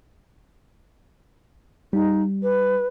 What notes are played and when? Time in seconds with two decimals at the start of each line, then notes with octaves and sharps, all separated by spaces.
1.93 G3 D#4
2.43 B4